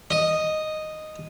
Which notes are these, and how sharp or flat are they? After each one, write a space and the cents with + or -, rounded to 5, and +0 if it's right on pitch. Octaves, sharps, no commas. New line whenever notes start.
D#5 -5